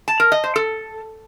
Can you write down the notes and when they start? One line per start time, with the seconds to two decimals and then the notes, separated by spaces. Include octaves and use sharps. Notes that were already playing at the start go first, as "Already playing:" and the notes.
0.08 A5
0.20 A#4
0.32 D#5
0.44 C5
0.56 A4